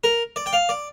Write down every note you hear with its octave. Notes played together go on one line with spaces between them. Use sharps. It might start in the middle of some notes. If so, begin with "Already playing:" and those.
A#4
D5
G5
F5
D5